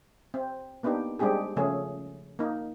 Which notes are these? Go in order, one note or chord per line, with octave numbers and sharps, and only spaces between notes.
C4
A#3 B3 D4 D#4 G4
G3 G#3 C4 D4 G4 G#4
C#3 F3 A3 C#4 G#4
A#3 D#4